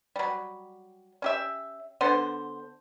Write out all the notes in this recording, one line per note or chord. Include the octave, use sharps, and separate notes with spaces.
F#3 G3
C#4 G4 E5
D3 B3 C5